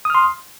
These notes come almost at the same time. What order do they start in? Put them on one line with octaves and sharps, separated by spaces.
D#6 F6 C6